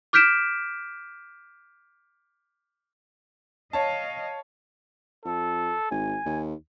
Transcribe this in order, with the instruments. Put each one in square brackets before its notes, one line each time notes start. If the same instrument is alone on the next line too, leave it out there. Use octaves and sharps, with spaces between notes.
[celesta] D6 F6 G6 B6 D7 E7
[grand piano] C#5 A5 [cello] D#5 F5
[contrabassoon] F2 [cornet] A4
[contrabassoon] G#1 [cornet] G#5
[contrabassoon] D#2